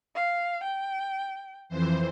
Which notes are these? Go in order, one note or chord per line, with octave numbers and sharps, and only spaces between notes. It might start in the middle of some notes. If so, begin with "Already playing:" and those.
F5
G5
F2 E3 C5